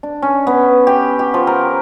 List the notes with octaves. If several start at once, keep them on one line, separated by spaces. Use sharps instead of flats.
D4
C#4
B3
G4
G4
F3
A#4